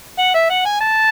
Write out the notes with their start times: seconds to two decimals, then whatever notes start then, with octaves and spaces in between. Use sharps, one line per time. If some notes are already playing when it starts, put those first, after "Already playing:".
0.19 F#5
0.35 E5
0.50 F#5
0.65 G#5
0.81 A5